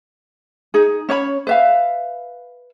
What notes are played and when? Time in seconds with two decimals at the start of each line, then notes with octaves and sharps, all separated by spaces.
0.74 D#4 G#4
1.09 C#4 C#5 D5 B5
1.47 B4 E5 F5